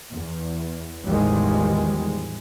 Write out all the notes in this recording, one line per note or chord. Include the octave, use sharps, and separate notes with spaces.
E2
A1 E2 D#3 F3 G3 G#3